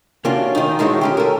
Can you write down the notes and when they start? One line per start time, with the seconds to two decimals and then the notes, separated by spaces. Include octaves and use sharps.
0.25 C3 A#3 C#4 D4 F4 F#4
0.55 D#3 D#4
0.79 D3 D#3 G#3 E4 F#4 C#5
1.01 D3 C#4 G4
1.17 A4 A#4